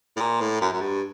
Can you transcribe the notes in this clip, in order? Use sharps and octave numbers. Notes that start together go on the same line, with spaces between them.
A2
A#2
A2
F#2
F#2
G2